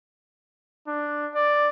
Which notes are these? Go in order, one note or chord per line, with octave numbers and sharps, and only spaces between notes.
D4
D5